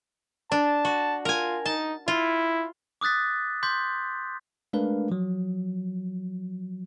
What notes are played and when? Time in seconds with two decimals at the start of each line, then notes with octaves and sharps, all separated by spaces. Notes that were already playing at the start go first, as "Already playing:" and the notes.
0.52 D4 A5
0.85 F#4
1.25 F4 A#4 G#5
1.66 D#4 A5
2.08 E4 F4
3.01 D6 D#6 F#6 A6 B6
3.63 C6 D6 G6 B6
4.73 G#3 A3 D4 A#4 B4 F5
5.09 F3 F#3